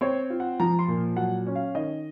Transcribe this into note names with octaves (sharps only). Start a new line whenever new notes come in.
C4 C#5
F4
F#5
F3 A#5
C6
A#2
F#3 F#5
C#4
F5
D#3 D#5